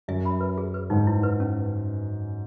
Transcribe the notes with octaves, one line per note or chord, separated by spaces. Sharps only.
F#2 E5
B5
B4
G#4
B4
G#2 D#4
E4
B4
C#4